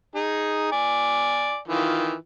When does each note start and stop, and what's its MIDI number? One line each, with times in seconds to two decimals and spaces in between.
0.15 0.70 63
0.15 0.70 68
0.72 1.58 74
0.72 1.58 80
1.68 2.15 51
1.68 2.15 52
1.68 2.15 65